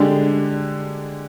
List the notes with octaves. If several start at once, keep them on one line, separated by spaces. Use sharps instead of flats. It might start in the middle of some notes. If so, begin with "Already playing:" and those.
Already playing: D3 G#3 D4 G4